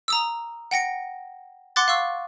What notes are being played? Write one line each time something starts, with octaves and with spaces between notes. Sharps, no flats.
A#5 D#6 E6
F#5 G5 A#6 C#7
F#5 C6 D6 F#6 A6
F5 C#6 E6